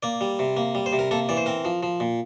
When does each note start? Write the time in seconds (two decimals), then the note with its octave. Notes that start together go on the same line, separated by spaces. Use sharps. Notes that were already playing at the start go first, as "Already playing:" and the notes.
0.03 A#3 D5
0.21 G3
0.39 C3
0.57 A#3
0.75 G3
0.86 C5
0.93 C3
0.99 A#4
1.11 A#3 A4
1.29 E3 D5
1.37 C5
1.46 C4 A#4
1.65 F3
1.83 F3
2.00 A#2